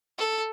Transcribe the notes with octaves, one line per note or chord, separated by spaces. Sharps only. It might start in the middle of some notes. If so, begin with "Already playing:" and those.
A4